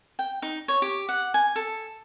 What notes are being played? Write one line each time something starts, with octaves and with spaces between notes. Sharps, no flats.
G5
D#4
C#5
G4
F#5
G#5
A4